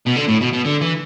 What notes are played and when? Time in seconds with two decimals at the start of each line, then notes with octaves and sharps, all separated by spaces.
0.07 B2
0.17 D3
0.29 A2
0.41 B2
0.53 B2
0.65 D3
0.82 E3